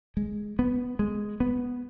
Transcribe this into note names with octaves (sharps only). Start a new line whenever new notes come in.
G#3
B3
G#3
B3